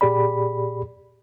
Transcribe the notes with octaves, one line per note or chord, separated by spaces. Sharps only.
A#2 G4 G#4 D5 B5